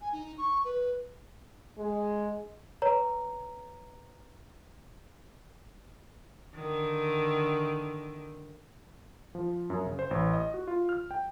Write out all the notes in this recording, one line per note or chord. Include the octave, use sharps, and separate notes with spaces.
G#5
D#4
C#6
B4
G#3
B4 C#5 A#5
D3 D#3
F3
F#2
C#3
C5
A1
D#5
F#4
F4
F6
G5